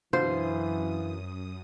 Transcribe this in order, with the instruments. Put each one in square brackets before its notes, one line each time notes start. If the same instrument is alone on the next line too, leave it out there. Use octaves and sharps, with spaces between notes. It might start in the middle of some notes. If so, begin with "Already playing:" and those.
[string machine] F#2 D#6 [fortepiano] B2 D3 F4 [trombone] E3 [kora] C5